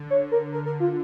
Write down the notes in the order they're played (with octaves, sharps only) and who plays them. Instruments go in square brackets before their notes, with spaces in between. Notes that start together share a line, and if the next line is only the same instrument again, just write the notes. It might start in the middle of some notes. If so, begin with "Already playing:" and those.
Already playing: [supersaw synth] D3
[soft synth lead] C#5
A#4
A#4
A#4
F4